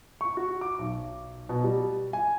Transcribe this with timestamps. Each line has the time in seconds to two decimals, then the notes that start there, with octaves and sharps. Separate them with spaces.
0.21 C#6
0.37 F#4
0.61 D6
0.79 B1
1.49 B2
1.64 G3
2.13 G#5